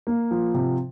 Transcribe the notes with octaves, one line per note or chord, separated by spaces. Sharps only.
A#3
F3
C3